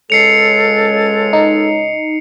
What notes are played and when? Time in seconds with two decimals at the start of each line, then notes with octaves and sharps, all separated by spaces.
0.10 C#2 C#3 G#3 A4 C7 C#7 F7
1.33 D#4